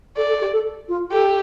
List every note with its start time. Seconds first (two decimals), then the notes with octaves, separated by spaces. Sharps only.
0.17 A4 D5
0.29 A4
0.41 G4
0.53 A4
0.89 F4
1.12 G4 A4